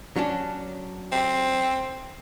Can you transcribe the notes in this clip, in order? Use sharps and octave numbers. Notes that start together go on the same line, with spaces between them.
F#3 C#4 D4
C4